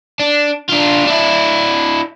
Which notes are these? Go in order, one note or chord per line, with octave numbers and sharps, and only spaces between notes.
D4
D4 F4
D4 E4